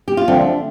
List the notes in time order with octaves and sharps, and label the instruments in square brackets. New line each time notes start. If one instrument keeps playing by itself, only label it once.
[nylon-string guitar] G4
F4
[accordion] D3 F3 C4 [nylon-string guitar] A3 D4